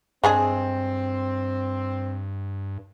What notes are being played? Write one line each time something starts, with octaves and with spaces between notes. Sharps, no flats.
G2 G#3 C4 D4 G#4